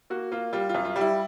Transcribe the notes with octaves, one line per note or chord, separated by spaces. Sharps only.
A#3 F#4
A#3 F4
G3 F4
F4
F#2
F4
G3
E4